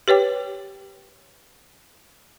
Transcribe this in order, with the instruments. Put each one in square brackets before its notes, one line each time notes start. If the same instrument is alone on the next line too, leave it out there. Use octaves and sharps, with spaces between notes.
[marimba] G4 B4 C#5 G5 D6